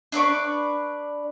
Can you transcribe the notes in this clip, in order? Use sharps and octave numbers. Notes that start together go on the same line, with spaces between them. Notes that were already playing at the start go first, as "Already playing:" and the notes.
D4 B4 D5 C#6